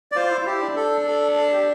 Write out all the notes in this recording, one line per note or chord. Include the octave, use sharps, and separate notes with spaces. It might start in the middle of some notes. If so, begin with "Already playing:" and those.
D5
F4 C5
E4
F4
E4 G4
D4
A4
A4
A4
G4